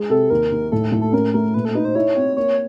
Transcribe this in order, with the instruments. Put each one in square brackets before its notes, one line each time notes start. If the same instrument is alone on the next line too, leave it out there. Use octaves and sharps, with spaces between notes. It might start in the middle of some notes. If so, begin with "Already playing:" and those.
Already playing: [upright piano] G#3
[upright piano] C3 [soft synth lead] A4
[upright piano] D#2 [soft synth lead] A#4
[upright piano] D#2
[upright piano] A2 [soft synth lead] A4
[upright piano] A2
[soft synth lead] A4
[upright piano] C#4 [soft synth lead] A#4
[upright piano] A3 [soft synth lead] A#4
[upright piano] A#2 [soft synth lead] B4
[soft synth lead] A4
[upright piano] D#4 [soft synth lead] B4
[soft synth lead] C5
[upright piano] E4 [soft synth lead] C#5
[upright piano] C4
[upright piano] A#3 [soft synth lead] C#5